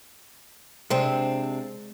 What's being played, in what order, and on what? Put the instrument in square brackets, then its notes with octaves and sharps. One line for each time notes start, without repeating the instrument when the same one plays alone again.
[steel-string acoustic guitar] C3 C4 D4 [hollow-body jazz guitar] G#3 C5